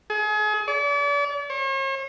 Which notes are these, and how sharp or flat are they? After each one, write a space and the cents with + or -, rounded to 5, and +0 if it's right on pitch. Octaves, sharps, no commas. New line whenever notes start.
G#4 +35
D5 -40
C#5 -45